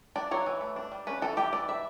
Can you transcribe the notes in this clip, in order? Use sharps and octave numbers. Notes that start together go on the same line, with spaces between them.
D4 D5
F#3 C#5
E3
A3
D4
G3
C#4 B4
E3 A4
E3 G4
E3 D5
G3 E5